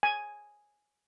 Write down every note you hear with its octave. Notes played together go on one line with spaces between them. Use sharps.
G#5